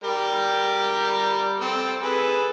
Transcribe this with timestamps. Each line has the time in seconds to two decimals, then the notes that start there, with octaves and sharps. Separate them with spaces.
0.04 G3 G4 A#4
1.61 C4 A4
2.02 G#4 A4 B4